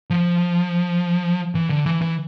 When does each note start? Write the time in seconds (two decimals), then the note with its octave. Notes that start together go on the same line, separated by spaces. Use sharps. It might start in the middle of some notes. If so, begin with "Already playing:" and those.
0.10 F3
1.55 E3
1.70 D3
1.86 E3
2.01 E3